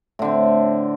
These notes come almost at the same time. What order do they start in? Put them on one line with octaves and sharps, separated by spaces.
A2 D3 C4